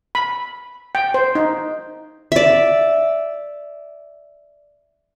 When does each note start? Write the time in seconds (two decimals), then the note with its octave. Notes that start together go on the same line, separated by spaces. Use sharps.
0.15 B5
0.95 G5
1.14 C5
1.35 D#4
2.32 D5 E5